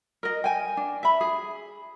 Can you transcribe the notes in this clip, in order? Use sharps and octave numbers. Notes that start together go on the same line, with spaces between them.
A#4 D#5
G5 G#5
D4
E5 B5
G#4